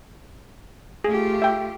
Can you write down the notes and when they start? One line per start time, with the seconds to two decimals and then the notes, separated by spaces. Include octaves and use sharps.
1.04 A3 F4 G4 G#4
1.42 E5 G5